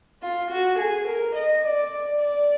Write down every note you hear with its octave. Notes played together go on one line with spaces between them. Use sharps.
F4
F#4
G#4
A#4
D#5
D5
D5